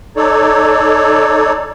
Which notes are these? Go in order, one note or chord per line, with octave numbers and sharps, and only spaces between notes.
D#4 A4 C#5 D5